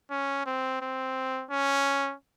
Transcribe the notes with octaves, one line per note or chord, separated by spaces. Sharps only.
C#4
C4
C4
C#4